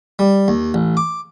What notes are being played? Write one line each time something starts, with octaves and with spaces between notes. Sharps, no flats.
G3
D#2
A1
D6